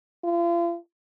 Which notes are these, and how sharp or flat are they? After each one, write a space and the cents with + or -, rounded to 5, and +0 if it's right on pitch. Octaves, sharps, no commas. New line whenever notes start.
F4 -40